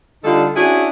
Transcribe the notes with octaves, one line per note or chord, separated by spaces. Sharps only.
D3 G3 D#4 F4 A4
C#4 D4 E4 F#4 G#4